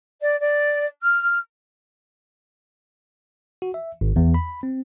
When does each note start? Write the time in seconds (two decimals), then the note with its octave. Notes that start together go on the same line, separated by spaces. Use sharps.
0.21 D5
0.39 D5
1.02 F6
3.62 F#4
3.74 E5
4.01 G#1
4.16 E2
4.34 B5
4.63 C4